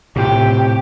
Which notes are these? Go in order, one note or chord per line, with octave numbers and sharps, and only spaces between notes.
A2 C3 G4